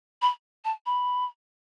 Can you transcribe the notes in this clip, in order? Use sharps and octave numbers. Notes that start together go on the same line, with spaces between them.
B5
A5
B5